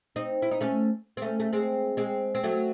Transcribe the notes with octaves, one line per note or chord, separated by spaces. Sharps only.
C4 D#4
E4
D#4
A3 C#4
C4
A3 C#4
A3
G#3 C4
G#3 C4
C4
F#3 A3